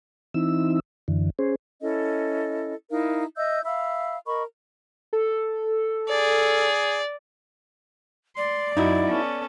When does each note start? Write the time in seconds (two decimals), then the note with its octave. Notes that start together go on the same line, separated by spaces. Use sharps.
0.34 E3 C4 D#4 E4 E6
1.08 F#2 D3 E3
1.39 C#4 G#4 C5
1.81 C#4 E4 A4 D#5
2.91 D#4 E4 A#4 F5
3.37 D#5 E5 E6 G6
3.65 E5 F5 B5 E6
4.26 A#4 D#5 B5 C#6
5.13 A4
6.08 G#4 D5
8.37 D5 C6
8.77 F#2 D#4 E4 F#4
9.07 B3 C#4 A4